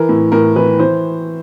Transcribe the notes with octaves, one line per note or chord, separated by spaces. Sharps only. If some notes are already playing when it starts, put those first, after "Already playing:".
Already playing: E3 A#4
A2
A2 A#4
E3 B4
E3 C5